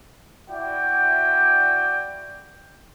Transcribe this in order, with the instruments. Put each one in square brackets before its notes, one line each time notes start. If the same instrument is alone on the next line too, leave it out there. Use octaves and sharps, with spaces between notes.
[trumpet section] E4 F#4 D5 G5